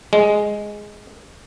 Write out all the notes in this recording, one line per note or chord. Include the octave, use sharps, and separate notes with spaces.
G#3